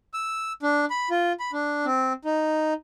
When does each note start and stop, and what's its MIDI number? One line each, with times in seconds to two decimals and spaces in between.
0.14 0.52 88
0.63 0.85 62
0.90 1.09 83
1.10 1.33 65
1.40 1.51 83
1.53 1.85 62
1.85 2.13 60
2.25 2.74 63